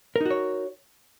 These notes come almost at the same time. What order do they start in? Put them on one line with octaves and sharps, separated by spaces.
A#4 D#4 F#4 C#5